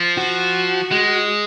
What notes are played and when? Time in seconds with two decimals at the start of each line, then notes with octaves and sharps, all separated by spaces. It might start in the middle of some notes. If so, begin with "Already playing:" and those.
Already playing: F3
0.17 F#4
0.91 G#3